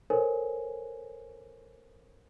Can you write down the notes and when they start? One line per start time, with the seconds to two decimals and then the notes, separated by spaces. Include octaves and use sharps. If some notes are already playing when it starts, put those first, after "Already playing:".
0.10 A4 A#4 C5 C#5 G#5